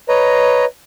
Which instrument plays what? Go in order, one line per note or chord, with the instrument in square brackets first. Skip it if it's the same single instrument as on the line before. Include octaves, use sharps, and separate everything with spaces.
[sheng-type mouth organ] B4 C#5 D#5 A#5